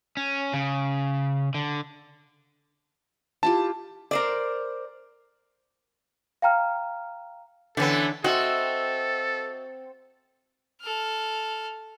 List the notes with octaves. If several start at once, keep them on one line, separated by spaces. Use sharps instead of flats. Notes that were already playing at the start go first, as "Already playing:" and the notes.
C#4
C#3
D3
E4 F4 G4 A5
A#4 C5 D5
F5 G5 A#5 F6
D3 E3 B3 C#4 A4
C4 F#4 A4 D#5 E5
A4 F6